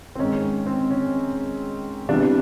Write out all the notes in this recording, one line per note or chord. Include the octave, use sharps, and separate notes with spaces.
C4
G#2 D#3 G#3 C#4
C4
C#4
C3 E3 G3 B3 D4